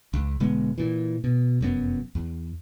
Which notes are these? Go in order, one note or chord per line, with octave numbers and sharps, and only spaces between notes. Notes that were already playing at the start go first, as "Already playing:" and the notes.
C#2
E1 D3 G#3 B3
A#2 E3
B2
F1 F#2 B3
E2